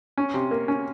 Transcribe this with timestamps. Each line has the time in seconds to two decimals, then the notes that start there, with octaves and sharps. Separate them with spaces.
0.18 C#4
0.34 C3
0.51 A#3
0.68 C#4